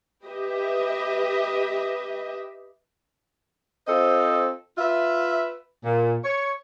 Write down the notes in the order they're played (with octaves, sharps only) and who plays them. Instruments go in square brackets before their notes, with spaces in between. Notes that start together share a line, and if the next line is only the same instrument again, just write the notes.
[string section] G4 B4 D#5 E5
[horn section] C4 F4 A4 C5 D#5
F4 B4 E5
A#2
C#5